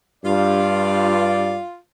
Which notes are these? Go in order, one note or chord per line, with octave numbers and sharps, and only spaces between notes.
G2 F4 D5